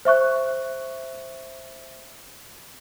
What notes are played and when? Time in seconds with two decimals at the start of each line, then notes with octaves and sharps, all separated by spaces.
0.05 C5 E5 C#6 F#6